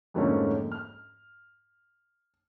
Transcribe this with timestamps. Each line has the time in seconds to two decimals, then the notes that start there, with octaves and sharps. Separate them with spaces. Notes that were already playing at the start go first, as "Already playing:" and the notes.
0.14 F2 G#2 D3 A3 A#3 C#4
0.72 F6